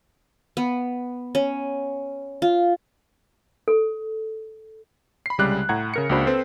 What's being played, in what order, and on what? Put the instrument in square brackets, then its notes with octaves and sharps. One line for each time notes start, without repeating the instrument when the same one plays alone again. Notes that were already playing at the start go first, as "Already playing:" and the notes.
[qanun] B3
C#4
F4
[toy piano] A4
[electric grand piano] B5 C7
C2 C#3 G3 G#3 D6 F#6
A2 F#5 A#5 G#6
C#3 A#4 C#7
C#2 A#3 D4 F#4 C5 B5
C4 A4 B4 C5